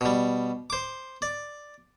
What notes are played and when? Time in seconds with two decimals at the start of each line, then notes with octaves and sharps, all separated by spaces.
0.01 B2 G3
0.70 C5 D6
1.22 D5